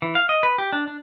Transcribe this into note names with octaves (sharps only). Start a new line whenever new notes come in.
E3
F5
D#5
B4
G4
D4
D4